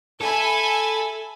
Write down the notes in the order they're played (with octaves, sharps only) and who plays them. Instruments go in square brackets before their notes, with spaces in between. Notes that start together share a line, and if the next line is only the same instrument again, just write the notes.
[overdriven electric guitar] A4 [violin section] E5 G#5 B5